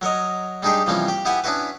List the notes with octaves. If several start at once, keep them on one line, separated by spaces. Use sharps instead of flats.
F#3 A#4 C#5 D#5
G3 G#3 D4 D#4 G4 G#4
C3 E3 F3 G3 A#3 C#4
G4 G5
B3 E4 G4 B4 F#5 G#5
B3 C#4 D4 E4 F#4 B4